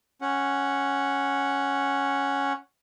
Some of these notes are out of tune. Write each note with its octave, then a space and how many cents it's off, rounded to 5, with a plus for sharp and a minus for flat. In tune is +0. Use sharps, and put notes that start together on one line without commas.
C#4 +0 F#5 +0